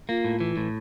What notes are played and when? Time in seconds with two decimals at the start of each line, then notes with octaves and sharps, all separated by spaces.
0.09 A#3 F4
0.24 A2
0.40 E3
0.57 A2